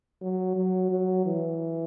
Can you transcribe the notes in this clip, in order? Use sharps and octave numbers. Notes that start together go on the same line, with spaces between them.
F#3
F#3
F#3
E3